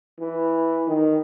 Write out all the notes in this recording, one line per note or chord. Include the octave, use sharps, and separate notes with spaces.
E3
D#3